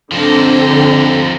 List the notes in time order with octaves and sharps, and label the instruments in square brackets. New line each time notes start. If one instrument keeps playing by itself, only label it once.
[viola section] D3 C4 [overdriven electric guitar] F3 D#4